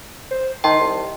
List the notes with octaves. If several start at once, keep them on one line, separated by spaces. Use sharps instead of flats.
C5
D#3 D#5 G5 A5 C6
C2